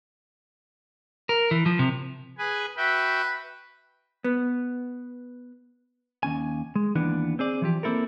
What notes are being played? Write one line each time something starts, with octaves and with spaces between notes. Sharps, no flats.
A#4
E3
F3
C3
G#4 B4 G#5
F#4 B4 E5 G5
B3
D#2 C#4 G#5
G#3
D#2 E3 B3 D4
C4 G#4 D5
E3 F3 G4
A#3 C4 E4 A4 A#4